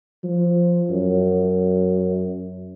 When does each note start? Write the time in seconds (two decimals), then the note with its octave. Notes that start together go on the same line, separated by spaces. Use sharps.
0.24 F3
0.90 F#2